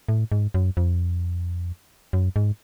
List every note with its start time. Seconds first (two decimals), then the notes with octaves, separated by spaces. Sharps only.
0.09 A2
0.32 G#2
0.54 F#2
0.77 F2
2.13 F#2
2.36 G#2